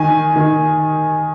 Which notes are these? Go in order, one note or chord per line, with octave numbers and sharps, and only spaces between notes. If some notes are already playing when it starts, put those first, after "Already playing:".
Already playing: D#3 G#5
D#3